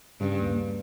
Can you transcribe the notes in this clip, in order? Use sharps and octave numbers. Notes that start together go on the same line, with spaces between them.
G2 C#3
D#2